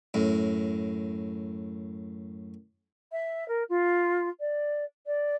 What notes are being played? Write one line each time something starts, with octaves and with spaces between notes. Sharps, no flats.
F#2 A2
E5
A#4
F4
D5
D5